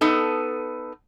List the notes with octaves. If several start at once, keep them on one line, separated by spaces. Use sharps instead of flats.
B3 D#4 A4